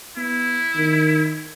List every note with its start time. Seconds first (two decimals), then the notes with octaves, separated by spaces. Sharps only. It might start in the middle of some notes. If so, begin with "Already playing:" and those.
0.17 B3 E4
0.76 D#3